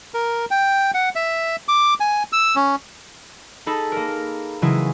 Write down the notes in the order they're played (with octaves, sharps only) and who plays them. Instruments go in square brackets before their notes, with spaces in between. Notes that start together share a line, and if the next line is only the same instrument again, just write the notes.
[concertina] A#4
G5
F#5
E5
D6
G#5
E6
C#4
[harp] D#4 G#4 A4 B5
A#3 A#4
C#3 E3 F#3 G#3 E4 G#4